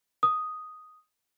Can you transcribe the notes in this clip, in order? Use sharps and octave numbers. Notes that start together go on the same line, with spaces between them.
D#6